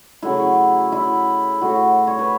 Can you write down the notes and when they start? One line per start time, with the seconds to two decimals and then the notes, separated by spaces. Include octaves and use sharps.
0.22 C#3 F#3 A3 E4
0.92 E4
1.61 A2 A3 F#4
2.07 C#5
2.19 B4